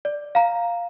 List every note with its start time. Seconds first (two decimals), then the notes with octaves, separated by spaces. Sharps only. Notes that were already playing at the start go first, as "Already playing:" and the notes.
0.05 D5
0.35 F5 A#5